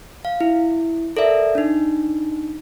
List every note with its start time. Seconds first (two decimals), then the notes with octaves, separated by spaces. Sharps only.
0.25 F5
0.41 E4
1.17 A4 A#4 D5 E5
1.55 D4 D#4